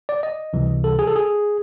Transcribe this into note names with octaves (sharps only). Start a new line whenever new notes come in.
D5
D#5
C#2 C3 E3 G3
A4
G#4
A4
G#4